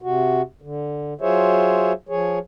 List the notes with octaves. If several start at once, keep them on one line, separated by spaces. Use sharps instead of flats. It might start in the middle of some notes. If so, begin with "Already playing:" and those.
C3 F#4
D3
F#3 F4 G#4 C5 C#5 E5
F3 G#4 C#5